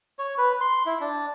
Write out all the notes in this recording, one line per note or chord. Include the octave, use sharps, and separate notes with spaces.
C#5
B4
C6
E4
D4